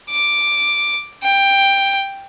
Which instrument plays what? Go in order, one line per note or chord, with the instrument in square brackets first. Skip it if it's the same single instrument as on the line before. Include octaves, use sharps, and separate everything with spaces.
[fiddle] D6
G5